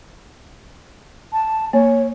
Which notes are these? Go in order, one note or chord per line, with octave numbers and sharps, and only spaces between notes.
A5
A#3 C#5